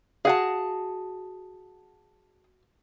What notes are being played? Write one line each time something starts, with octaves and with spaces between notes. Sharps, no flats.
F#4 G#4 F5 F#5 A5